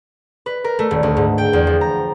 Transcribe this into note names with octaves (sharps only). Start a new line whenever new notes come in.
B4
A#4
A3
D#1
D2
G#2
G5
E2
F3
A#5